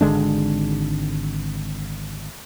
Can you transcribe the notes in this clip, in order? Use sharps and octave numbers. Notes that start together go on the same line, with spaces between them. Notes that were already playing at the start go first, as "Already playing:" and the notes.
G#1 D3 G#3 D4